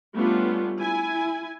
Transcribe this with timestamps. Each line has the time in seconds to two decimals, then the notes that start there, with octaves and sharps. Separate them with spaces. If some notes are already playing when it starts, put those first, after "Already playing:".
0.15 G3 A3 B3 C#4 D4 F4
0.79 E4 G#5